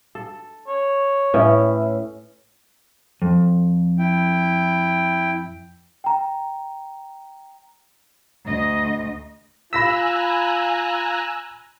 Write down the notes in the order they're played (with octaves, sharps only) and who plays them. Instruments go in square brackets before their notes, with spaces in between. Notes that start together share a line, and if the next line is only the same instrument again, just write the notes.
[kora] A4
[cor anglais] C#5
[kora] A2 C#4 [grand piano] B4 E5
[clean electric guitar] F2
[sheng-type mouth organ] E4 G5
[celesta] G5 A#5
[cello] D2 D#5
[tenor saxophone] F4 [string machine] G#5 A#5 F#6 [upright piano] B5 A#6 B6 [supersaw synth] E6